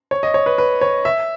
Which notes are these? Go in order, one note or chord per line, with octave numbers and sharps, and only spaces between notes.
C#5
D#5
C#5
B4
B4
C#5
E5